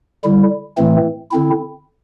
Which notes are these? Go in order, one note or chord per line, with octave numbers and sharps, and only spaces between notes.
D3 G3 E4
A2 E3 A3 C4
D3 C4 E4